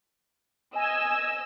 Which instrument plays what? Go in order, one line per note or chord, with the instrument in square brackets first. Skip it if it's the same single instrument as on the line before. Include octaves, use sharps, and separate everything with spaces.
[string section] D#5 E6 [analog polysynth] G#5